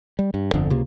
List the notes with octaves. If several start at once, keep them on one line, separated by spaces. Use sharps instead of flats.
G3
G2
G1 F2 D3
C#2 C3 A#3